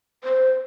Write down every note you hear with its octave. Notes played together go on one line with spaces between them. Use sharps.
C5